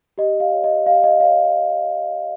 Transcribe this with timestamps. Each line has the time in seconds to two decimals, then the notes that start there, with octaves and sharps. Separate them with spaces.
0.18 G4 D#5
0.40 F5
0.52 C#5
0.64 D#5
0.86 G4 F5
1.04 D#5
1.20 C#5 F5